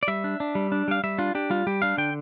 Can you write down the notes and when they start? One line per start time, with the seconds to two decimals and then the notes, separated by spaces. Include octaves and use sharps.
0.03 D5
0.08 G3 E5
0.24 D4
0.40 D4
0.55 G3
0.72 D4
0.88 G3 F5
1.04 G3 E5
1.19 D4 F4
1.35 D4 G4
1.50 G3 F4
1.67 G3 G4
1.82 D4 F5
1.98 D3 G5